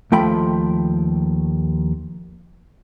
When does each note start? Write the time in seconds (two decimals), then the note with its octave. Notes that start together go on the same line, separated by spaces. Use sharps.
0.12 D#2 F3 A3 G5 B5